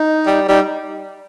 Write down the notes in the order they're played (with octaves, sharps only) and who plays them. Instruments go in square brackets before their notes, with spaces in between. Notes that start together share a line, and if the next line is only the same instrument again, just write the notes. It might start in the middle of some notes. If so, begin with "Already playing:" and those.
Already playing: [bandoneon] D#4
[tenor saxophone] G3
[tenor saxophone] G3 [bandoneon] D#4